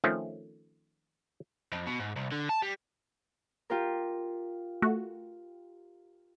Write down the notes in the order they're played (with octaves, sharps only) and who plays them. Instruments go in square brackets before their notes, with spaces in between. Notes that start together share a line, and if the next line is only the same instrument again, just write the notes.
[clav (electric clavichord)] D#3 F3 A3 C4 C#4
[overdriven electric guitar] F2
B2
G#2
C2
D3
A5
G3
[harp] F4 G4 A#4
[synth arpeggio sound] A3 F#4